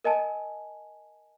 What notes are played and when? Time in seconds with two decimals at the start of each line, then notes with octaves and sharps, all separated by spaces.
0.04 A#4 D#5 G#5 A5